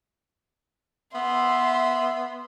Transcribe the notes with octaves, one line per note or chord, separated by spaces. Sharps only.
B3 E5 C6